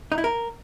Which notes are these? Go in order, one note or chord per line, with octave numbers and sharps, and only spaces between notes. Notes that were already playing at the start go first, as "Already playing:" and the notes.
D#4
E4
A#4